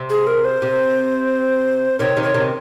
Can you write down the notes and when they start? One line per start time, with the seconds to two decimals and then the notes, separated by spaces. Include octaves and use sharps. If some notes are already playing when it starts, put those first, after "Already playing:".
Already playing: C3
0.10 G#4
0.27 A#4
0.45 C5
0.62 C3
1.99 C3 D#3 C#5
2.17 C3 D#3
2.23 C#5
2.34 C3 D#3